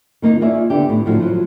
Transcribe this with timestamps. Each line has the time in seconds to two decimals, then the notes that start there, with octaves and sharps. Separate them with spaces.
0.22 D#3 A#3 D#4 F4
0.41 F4 G#4 C#5 D5 E5
0.70 D3 B3 D4 G4
0.89 A2
1.06 F#2 A2 D3 F3 F#3
1.20 F3 F#3